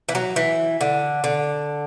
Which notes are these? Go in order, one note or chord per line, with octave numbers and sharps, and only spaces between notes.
E3
F#3
E3
D3
D3